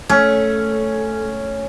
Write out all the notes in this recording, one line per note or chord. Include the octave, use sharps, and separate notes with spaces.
A3 C#4